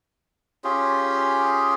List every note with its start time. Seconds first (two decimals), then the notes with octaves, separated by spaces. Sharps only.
0.64 C#4 F4 G4 G#4